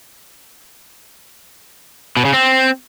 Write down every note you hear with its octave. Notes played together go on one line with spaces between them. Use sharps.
B2
C#3
C4